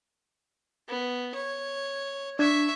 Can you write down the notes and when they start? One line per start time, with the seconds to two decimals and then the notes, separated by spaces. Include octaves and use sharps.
0.88 B3
1.35 C#5
2.39 D4 E5 C#6 G#6